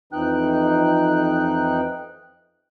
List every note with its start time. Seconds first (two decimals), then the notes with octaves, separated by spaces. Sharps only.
0.12 F2 E3 D#4 G5 F#6